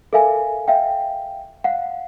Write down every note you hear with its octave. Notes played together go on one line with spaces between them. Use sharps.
A4 A#4 E5 F5 G#5
E5 F5 G5
F5 F#5